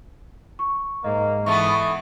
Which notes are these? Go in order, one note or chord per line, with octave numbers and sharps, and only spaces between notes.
C#6
G#2 A#3 D#5
E3 B3 A4 E5 C#6